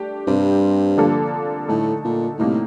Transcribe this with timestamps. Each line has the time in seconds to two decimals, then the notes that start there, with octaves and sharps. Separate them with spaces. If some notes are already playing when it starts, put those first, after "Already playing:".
Already playing: A3 D4 G4
0.27 G2 C3 G3 C4
0.98 D3 F3 A#3 D4 A4
1.69 A2 D3 A3 D#4 A4
2.04 A#2
2.39 A2 C3 G3 A#3 D#4